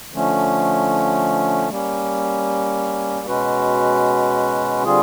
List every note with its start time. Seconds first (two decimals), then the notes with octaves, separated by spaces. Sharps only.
0.12 D3 F3 A3 C#4
1.69 G3 A#3 C#4
3.27 B2 G#3 C#4 F#4 B4
4.84 D3 G3 C4 F4 G#4